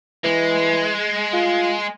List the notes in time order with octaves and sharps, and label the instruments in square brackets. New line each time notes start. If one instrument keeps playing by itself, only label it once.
[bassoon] E3 [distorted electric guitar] G#3
[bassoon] F4